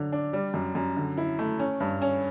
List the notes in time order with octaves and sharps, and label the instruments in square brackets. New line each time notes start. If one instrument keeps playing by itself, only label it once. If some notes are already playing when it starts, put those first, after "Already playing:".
Already playing: [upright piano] D3 F#3 D4
D4
G3
F#2
F#2
D3
E4
A3
C#4
G2
C#4